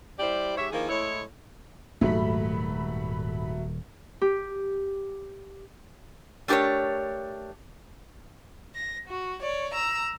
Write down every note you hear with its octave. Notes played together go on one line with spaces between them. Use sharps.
G3 E4 G4 C5 D5
G#2 G4 C#5 E5
D#3 F3 A#3 E4 G#4
A2 G#3 E4 C#5
D#1 G#2 F#3 A3 B5
G4
A3 D4 G4 A4 A#4 C#5
A#6
F#4
C#5 D5
A#5 E6